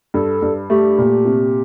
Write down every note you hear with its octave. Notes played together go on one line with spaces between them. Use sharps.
G2 A4
G2
A3 G4
A#2
C3